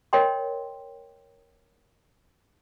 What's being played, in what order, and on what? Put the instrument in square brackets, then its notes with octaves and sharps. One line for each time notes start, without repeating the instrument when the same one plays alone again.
[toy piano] A#4 C#5 D#5 G5 C6